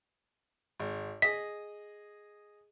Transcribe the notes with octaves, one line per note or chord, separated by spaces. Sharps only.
G#1
G#4 D#5 B6